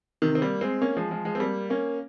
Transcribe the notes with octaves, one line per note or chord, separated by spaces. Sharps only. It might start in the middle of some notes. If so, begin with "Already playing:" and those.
C3 D#3
C4
G3 A#3
G#3 C4
A#3 C#4
F3 G#3
F3 G#3
F3 G#3
C4
G3 A#3
A#3 C#4